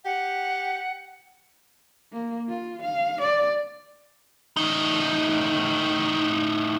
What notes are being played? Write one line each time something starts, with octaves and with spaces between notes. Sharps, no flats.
G4 F#5
A#3
F4
F5
D5
A2 D#4